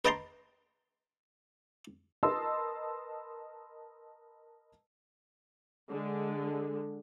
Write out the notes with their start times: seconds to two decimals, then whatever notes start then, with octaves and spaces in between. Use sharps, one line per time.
0.05 B4 D#5 G5 A5 A#5 C6
2.23 A#4 B4 D#5 A5 C6 E6
5.88 D3 G#3